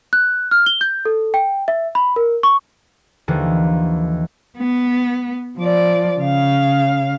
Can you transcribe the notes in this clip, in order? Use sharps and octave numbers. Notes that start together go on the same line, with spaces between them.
F#6
F6
G7
G6
A4
G5
E5
B5
A#4
C#6
D#2 D3 E3 F3
B3
F3 D5
C#3 F5